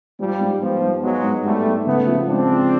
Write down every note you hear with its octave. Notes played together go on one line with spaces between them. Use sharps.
G#2 F3 G3
G#2
F3 G3 B3
G#2
F#3 G#3 B3
G#2
G#2 G3 A3
G#2
C#3 A3 B3
F3
G#3 C4 D4
F3